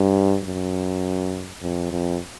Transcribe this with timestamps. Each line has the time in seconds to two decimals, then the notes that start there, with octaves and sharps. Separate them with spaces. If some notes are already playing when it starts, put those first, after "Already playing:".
Already playing: G2
0.44 F#2
1.62 F2
1.91 F2